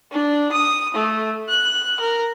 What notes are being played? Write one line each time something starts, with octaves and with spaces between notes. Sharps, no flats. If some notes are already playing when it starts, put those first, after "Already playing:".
D4
D#6
A3
F#6
A#4